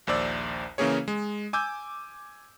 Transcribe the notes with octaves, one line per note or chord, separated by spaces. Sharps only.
A#1 D#2 C5 D5 E6
C#3 E3 A#3 C#4 G#4 C#5
G#3
G#5 D6 E6 G6